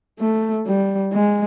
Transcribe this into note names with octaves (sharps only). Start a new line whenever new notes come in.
A3
G3
G#3